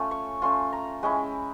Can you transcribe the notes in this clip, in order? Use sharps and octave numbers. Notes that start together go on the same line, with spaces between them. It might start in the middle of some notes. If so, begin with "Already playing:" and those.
Already playing: A3 C#4 F4
C#6
A3 C#4 F4 C6
A#5
G#3 C#4 E4 G5